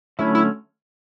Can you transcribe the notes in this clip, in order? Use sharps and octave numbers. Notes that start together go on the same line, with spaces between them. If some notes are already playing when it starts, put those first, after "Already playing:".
D3 F#3 A3 C#4 E4
E4